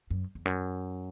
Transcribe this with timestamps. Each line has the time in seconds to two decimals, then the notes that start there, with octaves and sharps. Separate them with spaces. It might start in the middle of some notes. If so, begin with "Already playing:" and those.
0.11 F#2
0.35 E2
0.45 F#2